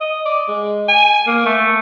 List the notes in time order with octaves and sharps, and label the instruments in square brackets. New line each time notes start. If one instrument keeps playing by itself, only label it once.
[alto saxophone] D#5
D5
G#3
G#5
A#3
A3